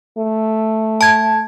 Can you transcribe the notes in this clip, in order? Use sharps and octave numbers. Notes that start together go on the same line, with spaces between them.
A3
A5 G#6